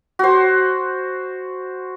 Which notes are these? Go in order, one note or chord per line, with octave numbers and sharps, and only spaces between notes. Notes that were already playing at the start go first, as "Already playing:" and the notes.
F#4 C5